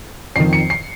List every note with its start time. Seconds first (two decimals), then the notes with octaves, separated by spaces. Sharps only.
0.36 F2 D#3 C7
0.53 C#7
0.70 C7